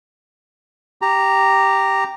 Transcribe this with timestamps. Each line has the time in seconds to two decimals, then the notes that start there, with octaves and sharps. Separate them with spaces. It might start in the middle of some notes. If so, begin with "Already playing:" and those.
1.02 G4 A#5